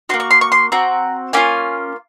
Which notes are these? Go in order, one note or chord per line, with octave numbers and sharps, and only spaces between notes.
A#3 C#4 F#4 C6
C#6
C6
C#6
C6
C4 F#4 A#5
A#3 C#4 F4 G#5